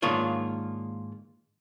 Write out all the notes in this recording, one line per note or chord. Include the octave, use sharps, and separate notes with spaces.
G#2 D#3 A#3 D4 F4 C#5